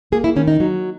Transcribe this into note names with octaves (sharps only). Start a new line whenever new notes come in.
A#3 G#4
E4
D#3 C#4
D#4
F#3